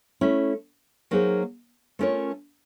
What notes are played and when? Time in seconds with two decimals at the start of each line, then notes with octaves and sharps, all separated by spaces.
0.21 A3 C#4 E4
1.11 F#3 A#3 D#4 G#4 C5
1.99 A3 C#4 F4 A#4 C#5